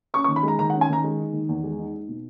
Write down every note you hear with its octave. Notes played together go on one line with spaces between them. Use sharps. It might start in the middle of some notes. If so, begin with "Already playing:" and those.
C#4 C#6
C#6
D#3
B5
G#3 A#5
D#3 A#5
F#5
C#4
G#5
D#3 A#5
G#3
D#4
D#3
E2
G#3
D#4
D#4
B2